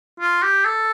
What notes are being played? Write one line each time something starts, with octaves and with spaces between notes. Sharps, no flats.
F4
G4
A4